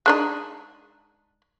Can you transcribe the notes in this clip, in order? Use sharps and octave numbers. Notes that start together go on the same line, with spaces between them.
G#3 D4 D#4